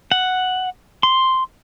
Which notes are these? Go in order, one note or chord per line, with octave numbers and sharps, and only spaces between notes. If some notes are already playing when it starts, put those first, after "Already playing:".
F#5
C6